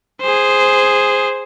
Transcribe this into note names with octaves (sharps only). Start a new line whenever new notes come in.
G#4 C5